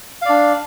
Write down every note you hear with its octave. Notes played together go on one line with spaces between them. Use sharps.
D4 D5 F5